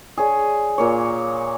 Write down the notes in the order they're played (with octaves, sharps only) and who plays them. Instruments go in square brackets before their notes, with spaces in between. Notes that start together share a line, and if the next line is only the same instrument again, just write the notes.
[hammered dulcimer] G#4 C#5 D5
A#2 A#3 C#5